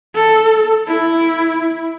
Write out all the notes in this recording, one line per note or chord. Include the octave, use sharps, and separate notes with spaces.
A4
E4